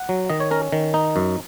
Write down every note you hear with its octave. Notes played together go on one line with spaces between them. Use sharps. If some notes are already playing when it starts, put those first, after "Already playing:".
Already playing: F#5
F#3
D#3 D#5
C#5
C#4 A#4
D#3
D#4
F#2